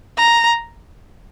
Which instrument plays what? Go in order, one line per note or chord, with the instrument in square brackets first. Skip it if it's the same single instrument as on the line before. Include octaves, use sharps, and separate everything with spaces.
[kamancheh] A#5